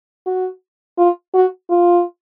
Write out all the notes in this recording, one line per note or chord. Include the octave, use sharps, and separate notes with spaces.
F#4
F4
F#4
F4